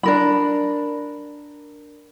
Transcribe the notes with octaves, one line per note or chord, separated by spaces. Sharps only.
D4 A#4 B5